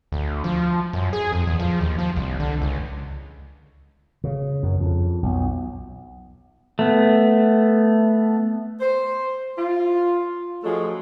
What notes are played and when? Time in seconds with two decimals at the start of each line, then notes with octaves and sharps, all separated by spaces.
0.12 D2
0.44 F3
0.93 F#2
1.13 G#4
1.32 F2
1.47 E2
1.60 F3
1.81 D#2
1.98 F3
2.17 C2
2.40 D3
2.62 C#2
4.24 C#3
4.63 F#2
4.80 F2
5.23 B1
6.79 A3 B3
8.80 C5
9.57 F4
10.64 F3 F#3 G#3 A3 C#4